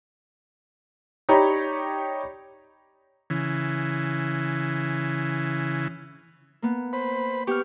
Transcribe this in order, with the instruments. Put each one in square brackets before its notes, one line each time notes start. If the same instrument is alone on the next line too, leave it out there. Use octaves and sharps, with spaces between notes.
[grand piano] D#4 G4 C#5 D5 A#5 B5
[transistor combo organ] C#3 E3
[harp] A#3 B3
[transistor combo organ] C5 B5
[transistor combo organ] B3 C#6 [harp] G4 F6